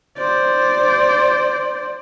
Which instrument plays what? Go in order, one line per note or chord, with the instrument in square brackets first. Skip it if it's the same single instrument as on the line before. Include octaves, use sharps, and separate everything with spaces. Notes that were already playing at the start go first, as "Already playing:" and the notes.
[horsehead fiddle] C5 D5